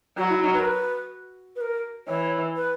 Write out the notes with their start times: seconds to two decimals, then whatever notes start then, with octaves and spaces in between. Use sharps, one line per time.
0.18 F#3 F#4
0.29 E4
0.42 D#4
0.54 B4
0.59 A#4
0.65 B4
1.56 B4
1.61 A#4
2.07 E3 C#5
2.56 B4